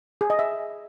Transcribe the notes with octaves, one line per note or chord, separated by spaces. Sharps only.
G#4
D#5
E5